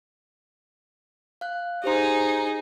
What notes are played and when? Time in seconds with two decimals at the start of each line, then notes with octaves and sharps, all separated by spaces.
1.41 F5 F#6
1.84 D#4 G4 G#4 C5 C6